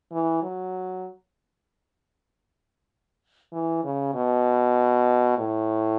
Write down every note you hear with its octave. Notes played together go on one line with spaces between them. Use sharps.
E3
F#3
E3
C#3
B2
A2